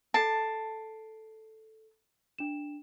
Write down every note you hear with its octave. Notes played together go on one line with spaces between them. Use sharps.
A4 A5 C7 D7
D4 E7